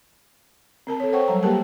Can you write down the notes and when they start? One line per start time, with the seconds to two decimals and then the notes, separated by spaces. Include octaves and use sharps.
0.87 C4 A#4 A5
1.00 A4 C#5
1.12 C5 C#5 F#5 G5 C#6
1.28 F#3 G3 A#5
1.43 A#3 G4 G#4 A#4 G5 A5